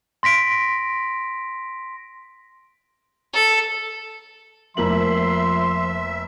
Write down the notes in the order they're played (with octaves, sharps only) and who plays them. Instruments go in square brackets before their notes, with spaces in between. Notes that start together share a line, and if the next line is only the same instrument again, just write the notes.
[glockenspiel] C6 A#6 B6 D7
[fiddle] A4
[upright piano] F1 A#3 F#7 [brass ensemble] F3 [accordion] E5 [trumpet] C6